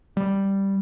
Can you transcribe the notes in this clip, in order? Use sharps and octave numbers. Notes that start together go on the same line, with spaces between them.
G3